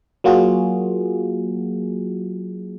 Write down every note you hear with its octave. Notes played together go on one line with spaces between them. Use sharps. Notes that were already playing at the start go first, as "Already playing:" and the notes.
F#3 A#3 F4 F#4 G#4